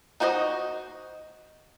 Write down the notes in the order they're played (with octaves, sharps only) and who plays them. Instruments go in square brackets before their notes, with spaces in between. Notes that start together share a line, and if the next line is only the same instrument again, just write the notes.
[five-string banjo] D#4 F#4 C5 D5 D#5